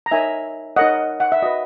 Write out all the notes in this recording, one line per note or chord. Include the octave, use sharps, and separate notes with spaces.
A#5
D#4 A#4 C#5 E5 G#5
D#4 A#4 C#5 D#5 F#5
F#5
E5
F#4 B4 D#5